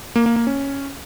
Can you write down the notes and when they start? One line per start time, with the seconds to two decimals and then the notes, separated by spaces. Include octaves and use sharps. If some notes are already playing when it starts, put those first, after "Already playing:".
0.16 A#3
0.26 A#3
0.36 A#3
0.47 C#4